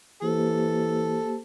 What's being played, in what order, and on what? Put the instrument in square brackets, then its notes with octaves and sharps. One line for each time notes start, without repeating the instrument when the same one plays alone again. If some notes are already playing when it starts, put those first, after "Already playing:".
[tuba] E3 [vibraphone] A#3 G4 C5 [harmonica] A4